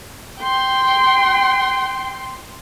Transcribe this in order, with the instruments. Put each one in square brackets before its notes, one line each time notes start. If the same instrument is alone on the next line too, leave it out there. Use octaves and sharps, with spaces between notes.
[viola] G5 C6